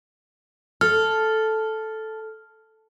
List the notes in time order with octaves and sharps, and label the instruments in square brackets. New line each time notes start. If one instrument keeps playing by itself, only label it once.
[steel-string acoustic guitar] A4 [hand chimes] F6